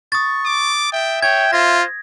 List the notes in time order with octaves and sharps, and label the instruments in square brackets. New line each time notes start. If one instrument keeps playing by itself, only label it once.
[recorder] C#6 [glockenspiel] D#6 A6
[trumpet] D6
[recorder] E5 [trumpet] G5
[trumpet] C#5 [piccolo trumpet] G5 [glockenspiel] G#6
[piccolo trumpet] F4 [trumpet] C5 [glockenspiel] A#6